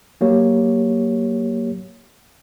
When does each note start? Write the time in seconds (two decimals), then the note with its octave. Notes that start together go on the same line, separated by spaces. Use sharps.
0.21 F#3 A#3 G4 C#5